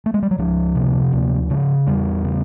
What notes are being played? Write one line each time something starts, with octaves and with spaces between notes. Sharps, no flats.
A3
G#3
G3
F#3
C#2 F3
C3
D2
C#3
E2 G3
C#3